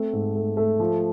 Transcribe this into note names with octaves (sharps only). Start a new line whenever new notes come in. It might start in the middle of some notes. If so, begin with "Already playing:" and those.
Already playing: A3 C4
G#2
A3
A3
F3